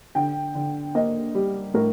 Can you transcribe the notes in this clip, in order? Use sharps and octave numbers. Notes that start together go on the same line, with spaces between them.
D3 G5
D3
A#3 D#5
G3
A2 A#4